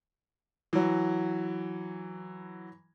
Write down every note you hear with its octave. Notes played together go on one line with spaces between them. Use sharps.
E3 F#3